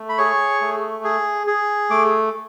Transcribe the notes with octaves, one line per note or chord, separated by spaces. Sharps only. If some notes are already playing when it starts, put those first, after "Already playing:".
Already playing: A3
B5
G#4 C#5 C#6
A3
G#4
G#4
A3 D6